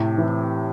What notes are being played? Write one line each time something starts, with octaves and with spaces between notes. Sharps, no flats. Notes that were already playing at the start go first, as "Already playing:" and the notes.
Already playing: A2 C3
E3